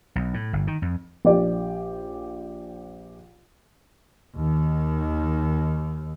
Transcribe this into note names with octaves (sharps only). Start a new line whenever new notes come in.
B1
A2
G1
D#3
F2
A#1 G4 D5
D#2 D#3